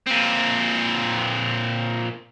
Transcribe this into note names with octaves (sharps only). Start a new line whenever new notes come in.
A#2 C4